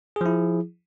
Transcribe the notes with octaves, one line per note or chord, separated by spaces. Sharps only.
F3 E4 G#4